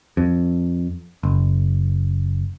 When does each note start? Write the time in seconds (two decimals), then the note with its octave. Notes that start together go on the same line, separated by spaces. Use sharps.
0.17 F2
1.23 F#1